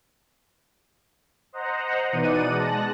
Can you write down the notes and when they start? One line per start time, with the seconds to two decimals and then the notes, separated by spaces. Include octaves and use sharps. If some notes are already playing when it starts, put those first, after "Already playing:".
1.53 C5 D#5 F#5 A#5
2.12 B2 E3 D#4 D5 F#5 D#7
2.50 G#3 A5 F#6 A#6